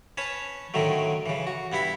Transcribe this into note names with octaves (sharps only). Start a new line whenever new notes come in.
C#4 B4 C#5 A5
A2 D3 D#3 F#3 A3
C#3 E3
F#4
G2 B3 E4 F#5 B5